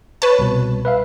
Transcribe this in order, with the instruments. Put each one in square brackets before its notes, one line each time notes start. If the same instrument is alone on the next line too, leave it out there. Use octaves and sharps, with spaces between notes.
[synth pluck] B4 C#5 A5
[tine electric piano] C2 B2
B4 E5 F5